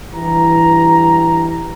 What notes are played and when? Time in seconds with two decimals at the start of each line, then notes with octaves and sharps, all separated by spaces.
0.14 G2 E3 G4 A#5